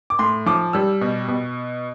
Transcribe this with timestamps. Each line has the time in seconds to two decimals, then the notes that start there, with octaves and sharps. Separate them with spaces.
0.10 D6
0.19 A2 C6
0.46 F3 D6
0.73 G3 E6
1.01 B2
1.28 B2